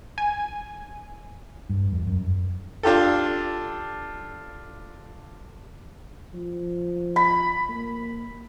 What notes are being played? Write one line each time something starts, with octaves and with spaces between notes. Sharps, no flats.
G#5
G2
F2
F#2
D4 F4 G4 A4
F3
B5
A#3